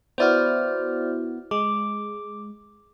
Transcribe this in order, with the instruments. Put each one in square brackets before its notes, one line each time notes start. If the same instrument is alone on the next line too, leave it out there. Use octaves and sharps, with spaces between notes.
[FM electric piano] B3 E4 F#4 [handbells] C5 D5 F6
[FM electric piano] G#3 [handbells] D6